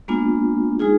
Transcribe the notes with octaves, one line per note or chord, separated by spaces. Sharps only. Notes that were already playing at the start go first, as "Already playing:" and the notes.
G#3 A#3 B3 D4 F4
G#3 D#4 F4 G#4